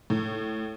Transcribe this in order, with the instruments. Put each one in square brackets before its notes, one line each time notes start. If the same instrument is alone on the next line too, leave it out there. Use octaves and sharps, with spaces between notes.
[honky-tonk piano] A2